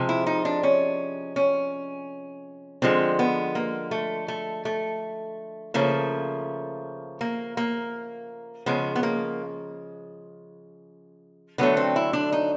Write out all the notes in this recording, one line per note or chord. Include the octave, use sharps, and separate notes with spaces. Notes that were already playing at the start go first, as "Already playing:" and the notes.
Already playing: C3 F3 G#3
E4
D#4
D4
C#4
C#4
D3 F3 G#3 C4
B3
A#3
A3
A3
A3
C#3 F3 A3 A#3
A#3
A#3
C#3 F3 G#3 B3
B3
A#3
D3 F#3 A3 B3
C4
E4
D4
D#4